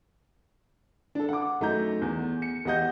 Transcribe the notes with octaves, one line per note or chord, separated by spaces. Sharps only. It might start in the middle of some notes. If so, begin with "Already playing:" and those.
D4 A4
F#5 D6
F#2 A3 D#4 A#5 G6
E2
C#7
E2 G4 D#5 F#5 G6